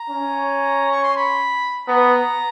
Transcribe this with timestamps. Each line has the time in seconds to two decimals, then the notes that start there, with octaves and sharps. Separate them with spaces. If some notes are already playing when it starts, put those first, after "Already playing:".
Already playing: A#5
0.10 C#4
0.92 C#6
1.04 C6
1.17 B5
1.88 B3 A#5